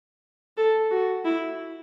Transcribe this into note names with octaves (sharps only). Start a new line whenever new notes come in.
A4
F#4
E4